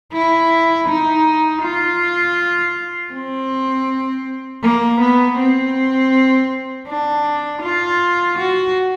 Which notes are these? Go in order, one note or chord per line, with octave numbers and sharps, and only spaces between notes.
E4
D#4
F4
C4
A#3
B3
C4
D4
F4
F#4